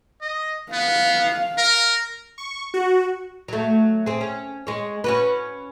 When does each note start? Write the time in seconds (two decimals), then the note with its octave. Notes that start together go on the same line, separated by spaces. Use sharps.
0.22 D#5
0.73 B3 F5
1.58 A#4
2.38 C#6
2.74 F#4
3.48 F#3 A3
4.06 C4 G#4
4.21 C#4
4.67 G#3 C#5
5.04 C#4 F#4 B4